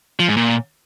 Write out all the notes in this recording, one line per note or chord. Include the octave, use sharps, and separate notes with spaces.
F3
G#2
A#2